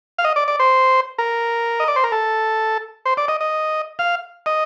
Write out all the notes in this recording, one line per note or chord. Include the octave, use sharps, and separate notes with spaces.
F5
D#5
D5
D5
C5
A#4
D#5
D5
C5
A#4
A4
C5
D5
D#5
D#5
F5
D#5